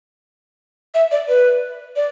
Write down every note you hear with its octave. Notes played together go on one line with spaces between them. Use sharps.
E5
D5
B4
D5